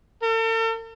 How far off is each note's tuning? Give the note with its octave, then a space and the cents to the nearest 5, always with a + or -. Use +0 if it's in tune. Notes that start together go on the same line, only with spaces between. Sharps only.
A4 +45